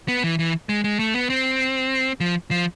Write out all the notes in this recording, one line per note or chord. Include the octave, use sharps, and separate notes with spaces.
B3
E3
E3
G#3
G#3
A3
B3
C4
F3
F3